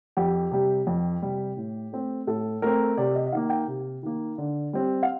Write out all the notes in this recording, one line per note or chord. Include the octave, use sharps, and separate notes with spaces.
F2 G4
C3 G3
F2
C3 G3
A2
A3 C4
A2 A4
A3 C4 A#4
C3 D5
D#5
D#5
D#3 A#3 F5
G5
C3
D#3 A#3
D3
G3 C4
F5